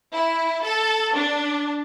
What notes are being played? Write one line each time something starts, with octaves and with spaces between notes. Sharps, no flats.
E4
A4
D4